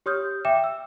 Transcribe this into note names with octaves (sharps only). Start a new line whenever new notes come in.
G4 C#5 C6 D#6 F6 G6
E5 G5 D6 E7
E6